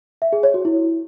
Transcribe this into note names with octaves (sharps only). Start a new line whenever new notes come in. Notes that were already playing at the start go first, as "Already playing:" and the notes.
E5
G#4
C#5
F#4
E4